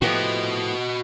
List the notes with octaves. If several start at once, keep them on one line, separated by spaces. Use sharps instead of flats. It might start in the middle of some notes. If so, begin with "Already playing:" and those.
A2 F3 B3 F#4 G4 D#5